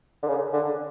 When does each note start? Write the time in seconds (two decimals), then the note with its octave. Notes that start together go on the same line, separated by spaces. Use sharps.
0.22 D3
0.28 C#3
0.53 D3